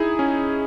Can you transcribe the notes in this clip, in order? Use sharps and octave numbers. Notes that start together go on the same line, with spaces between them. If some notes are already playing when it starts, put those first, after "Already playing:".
Already playing: D#4 E4 G#4
C#4